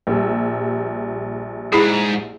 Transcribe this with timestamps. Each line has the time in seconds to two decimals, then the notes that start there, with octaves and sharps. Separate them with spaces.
0.07 A#1 G3 E6
1.72 G#2 E4 G#4